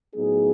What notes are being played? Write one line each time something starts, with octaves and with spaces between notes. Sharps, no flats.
A2 F#3 B3 D#4 G#4